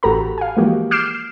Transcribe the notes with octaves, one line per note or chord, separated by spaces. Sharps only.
A1 F#4 G4 A4 A#5 B5
F5 G#5
E3 F3 G#3 A#3 F#4 G4
D6 F6 G6 C7 D7 E7